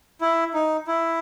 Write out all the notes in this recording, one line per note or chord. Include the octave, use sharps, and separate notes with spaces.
E4
D#4
E4